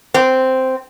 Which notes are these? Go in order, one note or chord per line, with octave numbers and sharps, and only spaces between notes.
C4